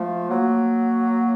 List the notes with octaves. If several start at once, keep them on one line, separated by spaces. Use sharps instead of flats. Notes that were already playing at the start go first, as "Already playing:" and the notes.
Already playing: F3 A3
F#3 A#3